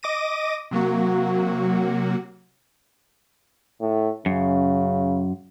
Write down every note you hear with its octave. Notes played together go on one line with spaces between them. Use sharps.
D#5 D6 A#6 D#7
C3 F#3 A#3 F#4
A2
F#2 C#3